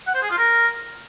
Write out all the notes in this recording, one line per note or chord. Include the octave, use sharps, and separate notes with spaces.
F#5
C5
G#4
F4
A#4